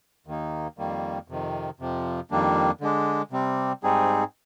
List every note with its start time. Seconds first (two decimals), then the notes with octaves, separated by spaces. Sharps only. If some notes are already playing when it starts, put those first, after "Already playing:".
0.27 D#2 D#3 A#3 D#4
0.78 F2 D#3 G3 A#3
1.28 F2 C3 D#3
1.80 F2 C3 F3
2.31 F2 D#3 G3 A#3 D4
2.81 D3 G#3 D4
3.31 C3 G3 C4
3.83 G#2 G3 C4 D#4 G#4